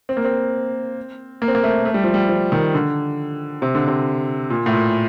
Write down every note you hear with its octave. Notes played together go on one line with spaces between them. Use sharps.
C4
A#3
C4
A#3
C4
A#3
A3
A3
G3
F3
G3
F3
D#3
D3
C3
D3
C3
A#2
A2
A#2